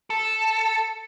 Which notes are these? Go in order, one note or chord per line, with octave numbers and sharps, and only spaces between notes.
A4